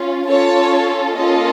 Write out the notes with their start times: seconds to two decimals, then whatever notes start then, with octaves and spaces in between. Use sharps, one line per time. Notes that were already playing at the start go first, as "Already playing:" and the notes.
Already playing: C#4 F4
0.28 C#4 F4 A4 C#5
1.15 A#3 C#4 F4 A4 D#5